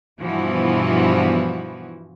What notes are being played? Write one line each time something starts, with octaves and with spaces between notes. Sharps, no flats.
G2 B2 E3 F3 B3 F#4